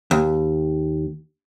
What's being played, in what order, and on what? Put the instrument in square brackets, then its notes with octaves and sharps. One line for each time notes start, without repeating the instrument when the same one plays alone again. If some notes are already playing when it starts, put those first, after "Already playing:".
[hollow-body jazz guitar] D#2